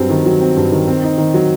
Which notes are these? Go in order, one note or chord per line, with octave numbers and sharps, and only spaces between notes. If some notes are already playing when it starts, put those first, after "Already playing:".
Already playing: G2 F#3 C4
D#3
F#3
C4
G2
D#3
C4
D#4
D#3
F#3